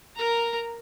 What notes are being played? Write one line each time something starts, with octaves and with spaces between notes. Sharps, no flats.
A#4 A#5